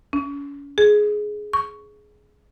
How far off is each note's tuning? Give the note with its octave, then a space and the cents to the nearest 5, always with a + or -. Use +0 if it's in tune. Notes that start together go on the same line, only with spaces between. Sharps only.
C#4 +35
G#4 +10
C#6 +10